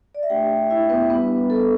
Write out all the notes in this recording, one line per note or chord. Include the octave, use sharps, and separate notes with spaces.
D5
E5
A3 D4 G4 G5
E4 E5
B3 B4
G3 B3 D4 B4
A4